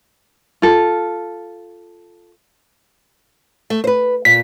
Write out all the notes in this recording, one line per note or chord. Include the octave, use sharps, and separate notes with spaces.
F4 A4
A3
B4 C5
A#2 B6